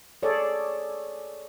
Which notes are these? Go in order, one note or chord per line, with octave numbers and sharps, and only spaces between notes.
G#4 A4 C#5 D5